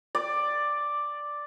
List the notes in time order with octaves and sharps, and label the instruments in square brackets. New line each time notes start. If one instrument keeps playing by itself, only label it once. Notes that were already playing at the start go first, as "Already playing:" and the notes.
[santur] D5